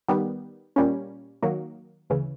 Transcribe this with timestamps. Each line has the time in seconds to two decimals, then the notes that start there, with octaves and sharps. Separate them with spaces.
0.08 D#3 G3 B3
0.76 A#2 G3 A#3 C#4
1.43 D#3 F#3 A#3
2.10 D2 C#3 E3